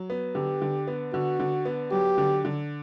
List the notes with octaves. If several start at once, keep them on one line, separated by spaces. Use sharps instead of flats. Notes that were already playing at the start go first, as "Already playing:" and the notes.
Already playing: F#3
B3
D3 G4
D3
B3
D3 F#4
D3
B3
F#3 G4
D3
D3